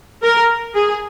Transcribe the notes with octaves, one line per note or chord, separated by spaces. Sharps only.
A#4
G#4